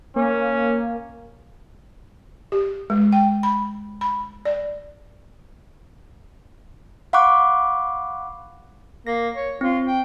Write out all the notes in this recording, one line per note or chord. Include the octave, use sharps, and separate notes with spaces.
A#3 C#4
G4
G#3
G5
B5
B5
D5
F5 F#5 B5 C#6 D6 F#6
A#3 A#6
C#5
C4 F4
G5